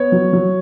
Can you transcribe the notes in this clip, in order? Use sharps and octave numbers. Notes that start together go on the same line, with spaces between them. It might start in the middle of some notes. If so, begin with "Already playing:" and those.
Already playing: B3 C#5
F#3
F#3